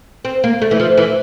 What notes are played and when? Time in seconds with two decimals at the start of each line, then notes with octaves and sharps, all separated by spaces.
0.25 C4
0.44 A#3
0.62 A3
0.71 E3
0.80 F3
0.97 E3